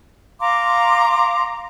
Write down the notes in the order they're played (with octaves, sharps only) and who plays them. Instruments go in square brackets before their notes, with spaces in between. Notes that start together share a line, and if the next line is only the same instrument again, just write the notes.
[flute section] F5 A#5 C6 D6